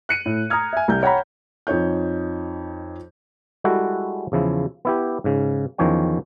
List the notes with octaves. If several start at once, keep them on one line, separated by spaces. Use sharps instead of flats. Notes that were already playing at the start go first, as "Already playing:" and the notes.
F#6 C#7 D#7
A2
A#5 D#6 F6 G#6
E5 G#5
C2 G6
C#5 F#5 G5 A#5 B5
F2 D#4 C#5 G6
G3 G#3 E4 F#4 A4
E2 C#3 F3 E4
B3 E4 G4
G#2 C#3
E2 D#3 F3 C#4 C#5 G5